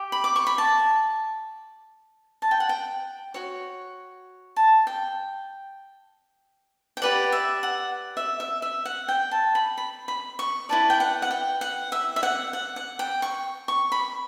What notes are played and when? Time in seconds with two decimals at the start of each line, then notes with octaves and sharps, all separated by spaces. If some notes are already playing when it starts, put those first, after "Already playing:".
Already playing: G4
0.12 B5
0.24 D6
0.36 C#6
0.47 B5
0.58 A5
2.42 A5
2.51 G5
2.60 F#5
2.69 G5
3.34 F#4 C#5
4.56 A5
4.87 G5
6.97 G5
7.02 G4 B4 D5 F#5
7.32 E5
7.63 F#5
8.17 E5
8.40 E5
8.62 E5
8.85 F#5
9.08 G5
9.31 A5
9.55 B5
9.78 B5
10.08 B5
10.39 C#6
10.69 E4 B4 D5 A5
10.90 G5
11.00 F#5
11.22 F#5
11.31 G5
11.61 F#5
11.92 E5
12.16 E5
12.23 F#5
12.53 F#5
12.76 F#5
12.99 G5
13.22 C#6
13.68 C#6
13.92 B5